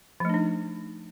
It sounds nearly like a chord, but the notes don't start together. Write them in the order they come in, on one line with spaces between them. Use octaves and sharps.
F3 A3 D4 D#4